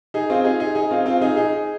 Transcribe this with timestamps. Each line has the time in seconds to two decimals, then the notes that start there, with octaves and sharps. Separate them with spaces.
0.14 D#4 G#4
0.30 C4 F4
0.44 D#4 G#4
0.60 D#4 G#4
0.75 D#4 G#4
0.91 C4 F4
1.06 C4 F4
1.21 D#4 G#4
1.36 D#4 G#4